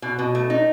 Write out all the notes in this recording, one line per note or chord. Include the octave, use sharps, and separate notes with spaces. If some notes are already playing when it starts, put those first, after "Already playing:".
B2
B2
A3
D#4